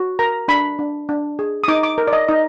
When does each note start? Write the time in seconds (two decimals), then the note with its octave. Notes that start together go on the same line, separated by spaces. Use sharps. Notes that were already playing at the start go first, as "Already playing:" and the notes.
Already playing: F#4
0.19 A#4 A#5
0.48 D4 B5
0.79 D4
1.09 D4
1.39 G#4
1.64 D#6
1.68 D#4 D6
1.83 D6
1.98 A#4
2.08 D5
2.13 D#5
2.28 D#4 D#5